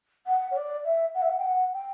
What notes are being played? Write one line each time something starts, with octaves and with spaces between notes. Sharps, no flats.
F#5
C#5
D5
E5
F#5
E5
F#5
G5
F#5
G5